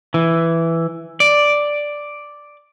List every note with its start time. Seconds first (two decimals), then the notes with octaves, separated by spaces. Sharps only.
0.14 E3
1.20 D5